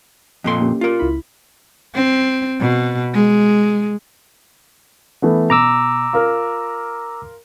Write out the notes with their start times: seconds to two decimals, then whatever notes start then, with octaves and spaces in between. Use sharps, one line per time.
0.44 F2 A#2 A4 D#5 C6
0.61 A#3 C#4 G4
0.81 F4 A#4
0.99 C#2 E4 B5
1.95 C4
2.60 B2
3.14 G#3
5.22 E3 A3 B3
5.50 B2 A#5 D6 E6
6.13 F4 A#4